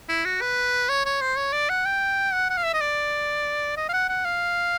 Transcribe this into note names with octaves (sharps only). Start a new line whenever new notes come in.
E4
F#4
B4
C#5
C#5
C5
C#5
D5
F#5
G5
F#5
F#5
F5
E5
D#5
D5
D#5
F5
F#5
F#5
F5